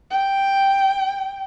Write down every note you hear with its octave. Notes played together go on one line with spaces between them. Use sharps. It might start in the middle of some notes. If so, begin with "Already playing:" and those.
G5